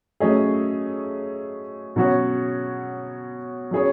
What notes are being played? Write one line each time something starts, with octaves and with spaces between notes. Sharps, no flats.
F#3 A3 C#4 G#4 D#5
B2 F#3 C#4 F#4 C#5
F#3 C#4 G#4 C#5